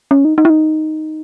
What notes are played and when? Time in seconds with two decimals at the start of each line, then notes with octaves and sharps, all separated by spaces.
0.11 C#4
0.25 D#4
0.38 D#4
0.45 E4
0.50 D#4